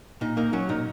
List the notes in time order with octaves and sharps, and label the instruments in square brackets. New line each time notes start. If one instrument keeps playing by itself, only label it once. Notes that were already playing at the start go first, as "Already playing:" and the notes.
[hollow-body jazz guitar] A#2 D#4
A#3 D#4
F#3 C#4
A#2 D#4